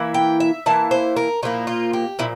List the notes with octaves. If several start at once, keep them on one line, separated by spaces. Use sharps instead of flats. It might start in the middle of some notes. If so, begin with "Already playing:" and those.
Already playing: E3 A#3 E4
G5
E5
E3 A#3 E4 A5
C5
A#4
A#2 F3 A#3 E4 F4
F4
G4
A#2 F3 E4